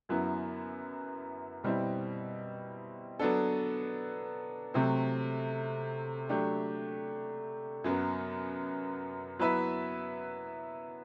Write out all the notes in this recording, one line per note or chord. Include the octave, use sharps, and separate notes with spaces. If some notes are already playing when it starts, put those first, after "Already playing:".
F#2 F#3 B3 E4
B2 G3 C4 E4
F#3 B3 D4 A4
C3 F#3 A3 C4
F#3 A3 D4 G4
F#2 F#3 B3
F#3 B3 E4 B4 E5